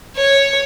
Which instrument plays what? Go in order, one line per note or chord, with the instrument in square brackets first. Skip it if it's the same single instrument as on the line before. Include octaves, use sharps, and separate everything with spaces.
[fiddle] C#5